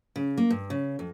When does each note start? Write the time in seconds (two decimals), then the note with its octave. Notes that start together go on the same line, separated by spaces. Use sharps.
0.16 C#3
0.37 A#3
0.50 G2
0.70 C#3
0.99 F2